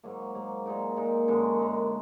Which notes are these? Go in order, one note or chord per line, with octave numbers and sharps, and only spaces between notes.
G#2 F#3 A#3
G#2 F#3 A#3
A#2 G#3 D#4 A#4
A#2 G#3 D#4 A#4
F#2 D3 G#3 D#4
F#2 D3 G#3 D#4